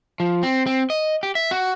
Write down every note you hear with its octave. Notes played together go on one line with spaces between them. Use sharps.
F3
C4
C4
D#5
G4
E5
F#4